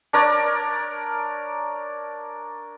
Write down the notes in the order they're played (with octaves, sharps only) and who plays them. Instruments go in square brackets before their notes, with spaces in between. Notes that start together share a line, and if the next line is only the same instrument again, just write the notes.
[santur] D4 A#4 C#5 D5